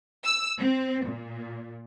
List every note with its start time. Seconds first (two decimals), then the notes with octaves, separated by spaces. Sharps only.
0.24 E6
0.59 C4
1.05 A#2